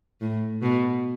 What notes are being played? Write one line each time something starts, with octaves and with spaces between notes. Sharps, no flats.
A2
B2